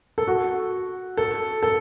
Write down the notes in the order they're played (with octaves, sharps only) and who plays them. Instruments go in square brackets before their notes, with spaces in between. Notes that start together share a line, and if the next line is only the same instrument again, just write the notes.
[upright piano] A4
F#4
A4
A4